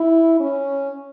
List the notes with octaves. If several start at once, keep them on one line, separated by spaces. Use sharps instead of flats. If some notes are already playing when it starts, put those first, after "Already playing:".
Already playing: E4
C#4